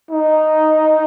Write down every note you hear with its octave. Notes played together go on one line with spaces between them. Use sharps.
D#4